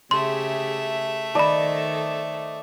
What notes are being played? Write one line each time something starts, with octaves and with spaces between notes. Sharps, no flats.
C#3 A3 G4 G#4 E5 C6
D#3 A4 C5 D5 D#5 A5 B5